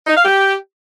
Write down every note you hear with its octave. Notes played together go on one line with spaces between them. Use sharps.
D#4
F5
G4